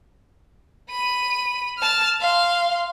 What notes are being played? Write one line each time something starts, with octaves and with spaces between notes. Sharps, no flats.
B5 D#7
A5 F6
F5 C6